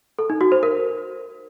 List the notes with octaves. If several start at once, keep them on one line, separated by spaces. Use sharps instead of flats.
A4
D#4
F#4
C5
A#4